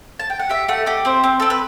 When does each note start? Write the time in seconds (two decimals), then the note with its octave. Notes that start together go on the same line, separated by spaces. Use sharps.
0.19 A5
0.30 G5
0.39 F#5
0.49 G4 E5
0.68 A3 F#5
0.86 G4 D#5
1.05 C4 C5
1.24 C4
1.40 C4 A4
1.50 B4